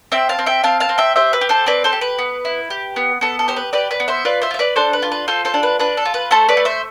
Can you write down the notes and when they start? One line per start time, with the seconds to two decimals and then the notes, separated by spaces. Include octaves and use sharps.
0.12 C4 E5 G5
0.29 F5 A5
0.39 C4
0.46 E5 G5
0.64 C4 F5 A5
0.80 F5 A5
0.89 C4
0.98 E5 G5
1.16 G4 C5 E5
1.33 B4
1.41 G4
1.49 A4 C5
1.66 C4 B4 D5
1.84 A4 C5
1.93 G4
2.01 B4
2.19 B3
2.45 E4
2.70 G4
2.96 B3
3.21 B3 A4
3.39 A4
3.48 G4 C5
3.57 B4
3.73 G4 B4 D5
3.91 B4 D5
4.00 B3
4.08 C5 E5
4.25 F4 B4 D5
4.42 C5 E5
4.51 F4
4.54 E5
4.59 B4 D5
4.76 D4 A4 C5
4.93 B4
5.02 F4
5.12 B4
5.28 F4 A4 C5
5.45 A4 C5
5.54 D4
5.63 B4
5.79 D4 B4
5.97 A4
6.05 F4
6.14 B4
6.31 A3 A4 C5
6.49 B4 D5
6.57 A3
6.65 C5 E5